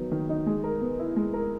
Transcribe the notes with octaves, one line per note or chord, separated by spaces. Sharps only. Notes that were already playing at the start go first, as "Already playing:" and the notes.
Already playing: D#3 F#3 B3 D#4
D#3
D#4
G#3
A#4
B3
E4
G#3
A#4